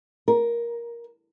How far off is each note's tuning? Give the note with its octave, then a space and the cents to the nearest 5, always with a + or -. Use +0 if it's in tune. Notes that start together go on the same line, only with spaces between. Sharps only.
A#4 +10